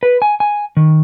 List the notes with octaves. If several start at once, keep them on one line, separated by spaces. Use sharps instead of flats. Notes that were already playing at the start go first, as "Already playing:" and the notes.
B4
G#5
G#5
D#3